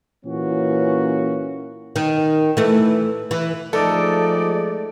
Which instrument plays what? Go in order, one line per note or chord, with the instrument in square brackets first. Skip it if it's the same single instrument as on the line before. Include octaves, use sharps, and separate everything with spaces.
[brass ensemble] A#2 E3 A#3 C#4 F#4
[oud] D#3
E3 A3
E3
[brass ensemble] F3 G#3 [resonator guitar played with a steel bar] A3 [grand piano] D#4 A4 [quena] D5